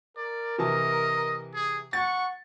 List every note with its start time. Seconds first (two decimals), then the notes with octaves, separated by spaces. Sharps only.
0.17 A#4 D5
0.58 C3 E3 D#5 A5
1.54 G#4
1.93 F#5 C#6 A6